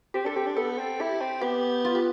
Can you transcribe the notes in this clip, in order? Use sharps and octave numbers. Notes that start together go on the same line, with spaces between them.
C4 G4
D4 A4
C4 G4
D4
B3 A4
C4
E4 G4
C4
B3 G4
F4
G4